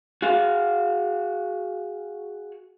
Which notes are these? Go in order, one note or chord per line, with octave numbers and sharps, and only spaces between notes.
F#4 G#4 F5